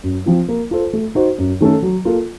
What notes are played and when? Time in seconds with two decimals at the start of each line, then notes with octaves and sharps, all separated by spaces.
0.03 F#2
0.26 F3 C4 F4
0.48 A#3
0.71 F4 A4 C5
0.93 A3
1.15 D#4 F#4 C5
1.38 F#2
1.60 D#3 A3 C#4 A4
1.82 F#3
2.05 A#3 F4 A4